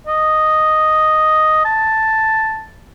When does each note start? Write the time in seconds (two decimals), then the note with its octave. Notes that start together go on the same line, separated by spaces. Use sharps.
0.07 D#5
1.65 A5